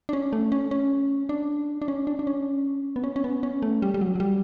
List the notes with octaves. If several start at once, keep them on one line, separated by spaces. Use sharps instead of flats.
D4
C#4
A3
C#4
C#4
D4
D4
C#4
D4
D4
C#4
B3
C#4
C#4
B3
C#4
A3
G3
G3
F#3
F#3
G3